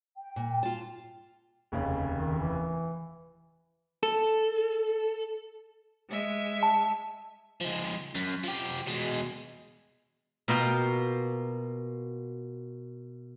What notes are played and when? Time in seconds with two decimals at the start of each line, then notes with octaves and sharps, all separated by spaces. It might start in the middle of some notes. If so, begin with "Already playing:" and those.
0.17 G5
0.36 A#2
0.63 F4 A5
1.72 F1 D#2 C#3
2.15 D#3
2.38 E3
4.03 A4
6.10 G#3 E5
6.63 A5
7.60 F3 G#3
8.15 F#2
8.44 F3 G4
8.87 B2 G#3
10.48 B2 A#3 F4 G5